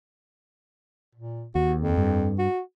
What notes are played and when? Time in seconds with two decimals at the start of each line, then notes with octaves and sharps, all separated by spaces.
1.15 A#2
1.55 D#2 F#4
1.81 F2
1.97 G2
2.39 F#4